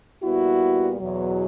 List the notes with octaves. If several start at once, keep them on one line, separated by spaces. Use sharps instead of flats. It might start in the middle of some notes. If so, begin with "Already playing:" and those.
A#2 G3 B3 E4 F#4
E2 B2 F#3